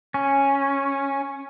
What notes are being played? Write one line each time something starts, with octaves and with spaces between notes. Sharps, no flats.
C#4